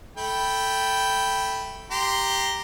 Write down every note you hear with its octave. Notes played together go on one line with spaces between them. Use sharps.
A3 G5 B5
G4 A#5 C6